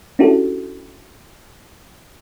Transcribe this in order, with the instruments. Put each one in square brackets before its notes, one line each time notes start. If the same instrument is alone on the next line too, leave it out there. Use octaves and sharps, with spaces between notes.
[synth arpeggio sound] C#4 D4 E4 F#4 G4 A4